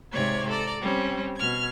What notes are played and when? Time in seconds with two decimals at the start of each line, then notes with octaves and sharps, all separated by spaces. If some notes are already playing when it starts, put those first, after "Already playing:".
0.12 G#2 C3 C#5 D5 G#6
0.49 A4 D5 A#5
0.82 G3 C4 C#4
1.36 B2 F6 G#6